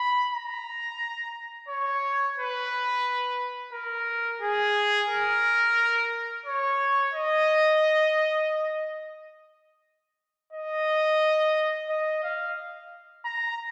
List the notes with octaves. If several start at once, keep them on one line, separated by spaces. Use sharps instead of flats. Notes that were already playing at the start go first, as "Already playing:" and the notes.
Already playing: B5
A#5
C#5
B4
A#4
G#4
A#4
C#5
D#5
D#5
D#5
F5
A#5